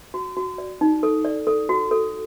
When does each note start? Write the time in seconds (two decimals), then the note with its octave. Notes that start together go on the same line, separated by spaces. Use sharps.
0.14 F#4
0.37 F#4
0.58 D5
0.81 D#4
1.03 A4
1.25 D5
1.47 A4
1.69 F#4
1.91 A4